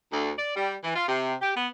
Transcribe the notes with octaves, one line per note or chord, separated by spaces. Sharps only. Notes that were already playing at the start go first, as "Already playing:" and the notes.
D2
D5
G3
E3
F4
C3
G4
B3